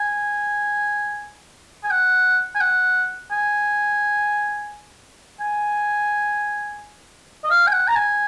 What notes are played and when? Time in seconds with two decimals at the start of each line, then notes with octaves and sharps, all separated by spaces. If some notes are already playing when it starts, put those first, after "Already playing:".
Already playing: G#5
1.84 G#5
1.91 F#5
2.55 G#5
2.61 F#5
3.31 G#5
5.41 G#5
7.44 D#5
7.50 F5
7.67 G#5
7.73 F#5
7.88 A#5
7.95 G#5